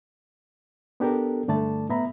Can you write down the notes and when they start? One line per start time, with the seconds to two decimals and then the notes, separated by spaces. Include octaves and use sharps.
1.00 B3 D4 G4 A4 A#4
1.48 G2 D3 A3 D5 A5
1.89 A2 B3 E5 A#5 B5